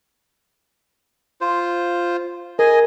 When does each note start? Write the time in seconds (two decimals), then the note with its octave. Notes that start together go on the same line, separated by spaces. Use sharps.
1.41 F4 C5
2.59 G#4 A#4 D#5 G#5